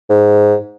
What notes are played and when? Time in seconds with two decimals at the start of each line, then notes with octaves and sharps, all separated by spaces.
0.10 G#2